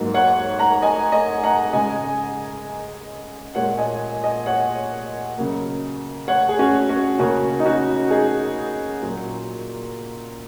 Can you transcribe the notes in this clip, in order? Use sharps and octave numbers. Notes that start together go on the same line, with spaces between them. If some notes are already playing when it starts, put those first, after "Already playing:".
Already playing: G#2 F#3 A#3
C#5 F#5
F#5 A#5
D#5 G#5
D#5 G#5
F#5 A#5
C#3 G#3 D#5 G#5
A#2 G#3 C#5 F#5
D#5 G#5
D#5 G#5
C#5 F#5
C#3 F#3 A#3
C#5 F#5
G#4
C#4 F#4
C#4 F#4
C#3 A#3 C#4 F#4
D#4
C#4 F#4
D#4 G#4
A#2 F#3 A#3